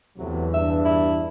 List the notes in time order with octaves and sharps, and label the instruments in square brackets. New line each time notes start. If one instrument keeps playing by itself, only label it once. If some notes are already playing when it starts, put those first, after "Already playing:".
[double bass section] E2 [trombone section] A2 C3 F#3
[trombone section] G2 D4 [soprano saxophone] E5
[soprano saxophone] E4